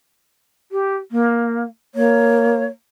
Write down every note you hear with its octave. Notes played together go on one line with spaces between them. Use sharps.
G4
A#3
A#3 C#5